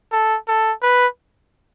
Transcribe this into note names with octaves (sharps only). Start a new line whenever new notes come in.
A4
A4
B4